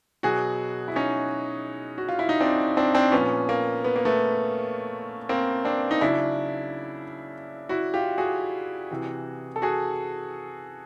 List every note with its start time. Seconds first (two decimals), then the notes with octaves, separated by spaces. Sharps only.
0.23 B2 F#3 F#4 G#4
0.88 E4
0.96 C#4 D#4
1.98 F#4
2.09 F4
2.19 E4
2.29 D#4
2.40 C4 D4
2.77 C4 D4
2.94 C4 D4
3.12 A#2 F3 B3 C#4
3.49 A#3
3.84 B3
3.96 A#3
4.05 A3 B3
5.29 A#3 C4
5.65 C4 D4
5.91 D#4
6.01 C#3 F#3 D4 E4
7.69 E4 F#4
7.94 F4 G4
8.18 F#4 G#4
8.91 C3 E3
9.56 A4
9.62 F#4 G#4